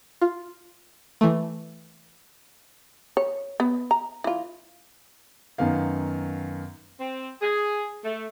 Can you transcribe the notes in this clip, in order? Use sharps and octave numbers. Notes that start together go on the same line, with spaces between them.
F4
E3 A3
C#5
B3
A#5
E3 F4
F#2 D#3 B3 F5
C4
G#4
A3